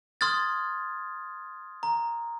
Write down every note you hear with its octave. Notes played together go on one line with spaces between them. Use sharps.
C6 D#6 F6 G#6 A6
A#5